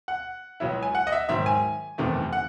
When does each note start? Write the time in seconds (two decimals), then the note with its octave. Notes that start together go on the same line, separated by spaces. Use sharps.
0.08 F#5
0.60 C#2 C#3 F#3 C#4 E4
0.83 G#5
0.95 F#5
1.07 D#5
1.12 E5
1.29 G#2 D#3 F#3 E5
1.46 G#5
1.98 F#1 E2 C3 D#3 A3
2.33 F#5